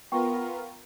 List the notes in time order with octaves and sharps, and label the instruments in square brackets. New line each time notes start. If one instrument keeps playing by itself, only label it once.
[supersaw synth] B3 F4 A#4 [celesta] G5 C#6